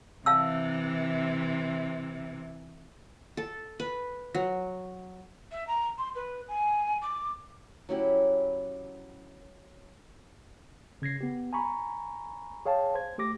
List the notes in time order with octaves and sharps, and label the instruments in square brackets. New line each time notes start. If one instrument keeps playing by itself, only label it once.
[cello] C3 E3 [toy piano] F5 A5 E6
[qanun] A4
B4
F#3
[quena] E5
A#5
C6
B4
G#5
D6
[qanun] F#3 C#4 E4 G4
[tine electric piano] C#3 G#6 A#6 C7
B3 G4
G#5 A#5 B5 C#6
G#4 C#5 F5 G5 A5
C5 G#6
A3 G4 D6 A#6